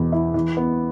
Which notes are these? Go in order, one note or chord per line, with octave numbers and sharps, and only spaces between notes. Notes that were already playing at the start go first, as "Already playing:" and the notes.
Already playing: E2 B2 B3
E4
E3
B3